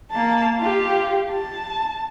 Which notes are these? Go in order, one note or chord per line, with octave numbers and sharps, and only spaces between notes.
A#3 A5
F4 G4
A5